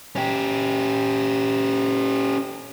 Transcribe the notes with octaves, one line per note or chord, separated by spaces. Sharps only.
C#4 G4